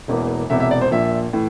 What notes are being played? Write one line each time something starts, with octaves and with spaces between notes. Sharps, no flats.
E1 E2 E3 A#3
E1 E2 C3 E5
E5
D5
C5
A#1 A#2 F3 E5
A2 E3